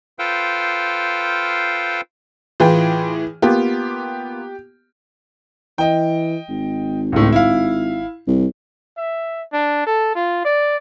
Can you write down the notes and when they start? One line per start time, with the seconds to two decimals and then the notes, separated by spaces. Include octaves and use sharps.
0.19 F4 A4 B4 C5 F5 G5
2.60 A2 E3 F4 G#4 B4 G5
3.42 A#3 B3 F4 G4
5.78 E3 D#5 G5
6.49 G#1
7.12 C#2 A2
7.32 E4 F5
8.27 C2
8.98 E5
9.53 D4
9.86 A4
10.16 F4
10.45 D5